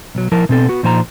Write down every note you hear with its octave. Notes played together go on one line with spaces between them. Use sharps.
B1 F#3
F3 E4 A#4 A5
B2 C4 A4
B3 F#4
A#2 F3 D#4 C5 G#5 A#5